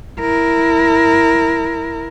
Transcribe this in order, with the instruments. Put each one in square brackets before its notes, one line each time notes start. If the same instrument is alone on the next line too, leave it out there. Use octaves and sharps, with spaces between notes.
[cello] E4 A#4